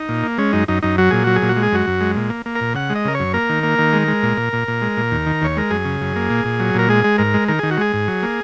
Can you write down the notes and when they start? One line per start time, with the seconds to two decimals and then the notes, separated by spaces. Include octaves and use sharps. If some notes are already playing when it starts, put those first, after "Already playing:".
Already playing: D#4
0.09 A#2
0.23 A#3
0.38 G#3 C#4
0.53 F#2 D#4
0.68 F#2 D#4
0.83 F#2 D#4
0.98 F#3 F#4
1.10 A#2 G#4
1.24 F#3 F#4
1.36 G#4
1.42 A#2
1.49 F#4
1.56 G#3
1.63 G#4
1.72 F#2 F#4
1.87 F#2
2.01 G#3
2.17 A#2
2.30 A#3
2.46 A#3
2.56 A#4
2.61 A#2
2.75 C#3 F#5
2.90 G#3
2.95 D#5
3.05 C#3 A#4
3.15 F#2 C#5
3.34 A#3 A#4
3.49 D#3
3.63 A#3
3.79 D#3
3.93 G#3
4.08 G#3
4.23 A#2
4.37 A#2
4.53 A#2
4.68 A#2
4.82 G#3
4.97 A#2
5.12 D#2
5.26 D#3
5.42 D#2 C#5
5.57 G#3 A#4
5.71 F#2 G#4
5.85 C#3
6.01 F#2
6.16 A#3
6.30 A#2
6.45 A#2
6.60 F#3
6.75 A#2 A#4
6.89 G#3 G#4
7.04 G#3
7.18 G#2 A#4
7.34 G#3
7.48 D#3 A#4
7.59 D#3 G#4
7.71 F#4
7.77 G#3 G#4
7.93 G#2
8.08 F#3
8.23 A#3